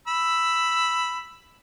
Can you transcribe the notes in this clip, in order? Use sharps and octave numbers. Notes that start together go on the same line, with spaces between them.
B5 E6